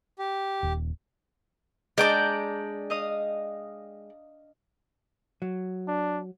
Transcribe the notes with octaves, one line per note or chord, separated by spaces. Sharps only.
G4
D#1
G#3 D4 D5 G5 A5 A#5 D6
D#5 F5 D#6
F#3
D4